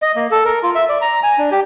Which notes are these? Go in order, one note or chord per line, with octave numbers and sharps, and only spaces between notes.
D#5
A#3
A4
A#4
F4
E5
D5
A#5
G#5
D4
G4